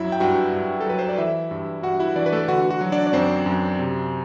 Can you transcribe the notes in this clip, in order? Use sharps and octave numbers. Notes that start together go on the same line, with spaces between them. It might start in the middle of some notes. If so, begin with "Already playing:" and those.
Already playing: F#2 F#3 E4 E5
G5
G2 F#4 F#5
G2
A4
F#3 B4
C5
D5
E3 E4 E5
G2
G2 F#4 F#5
E4 E5
E3 D4 D5
B4
A3 A4
D3 F#4 F#5
F#4 F#5
F#3
D4 D5
D5
F#2 C4 C5
F#2
C3